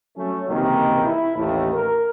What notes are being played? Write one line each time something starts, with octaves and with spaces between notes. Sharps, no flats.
F#3 A3 C#4
C#2 C3 D#3 E3 A#3 D#4
E4
A1 D#2 A3
A#4